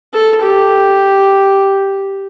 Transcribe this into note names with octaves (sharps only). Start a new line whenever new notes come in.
A4
G4